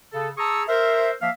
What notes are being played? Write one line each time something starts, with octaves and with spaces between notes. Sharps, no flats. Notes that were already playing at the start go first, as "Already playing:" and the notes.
C#3 A4
G#4 A5 A#5 C#6 D#6 E6
A#4 C5 E5
F3 A#3 E5 F5